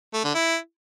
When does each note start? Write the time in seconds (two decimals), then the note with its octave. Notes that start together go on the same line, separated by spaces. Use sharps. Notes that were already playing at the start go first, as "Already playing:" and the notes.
0.14 A3
0.24 D3
0.34 E4